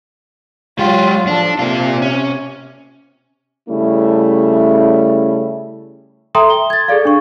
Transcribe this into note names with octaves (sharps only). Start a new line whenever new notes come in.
F#3 G#3 F4 G4
F3 D4 A4
C3 A#3 F4
C#4
C#3 G3 A3 C#4 E4
A4 E5 G5 A#5 C6 D#6
G7
G#6 A6
G#4 A4 D5 F5
D4 C#6